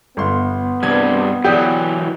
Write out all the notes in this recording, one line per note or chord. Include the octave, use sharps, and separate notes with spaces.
G1 B3 C6
G2 C3 G3 G#6
E3 F#3 G4 D5 D#6